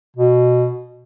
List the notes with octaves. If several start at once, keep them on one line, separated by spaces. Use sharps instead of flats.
B2